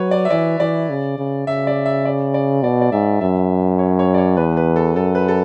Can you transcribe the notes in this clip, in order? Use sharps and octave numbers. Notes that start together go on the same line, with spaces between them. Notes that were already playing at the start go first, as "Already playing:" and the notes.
Already playing: F#3 B4 C#5
D5
E5
E3 D5
E3 D5
C#3
C#3
C#3 E5
D5
E5
D5
D5
B2 D5
D5
G#2 E5
F#2 E5
C#5
C#5
D5
C#5
E2 B4
B4
A4
F#2 A4
B4
A4